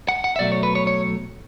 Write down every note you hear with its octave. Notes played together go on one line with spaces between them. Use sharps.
F#5
F#5
E5
B1 B2 F#3 A3 D5
C#5
B4
C#5
C#5